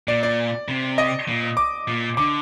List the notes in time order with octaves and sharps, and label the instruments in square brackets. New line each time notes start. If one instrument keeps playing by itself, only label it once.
[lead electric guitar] A#2 [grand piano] D5
[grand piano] D5
[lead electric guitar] C3
[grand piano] D#5
[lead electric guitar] A#2
[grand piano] D6
[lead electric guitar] A#2
[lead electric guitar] D3 [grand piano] D6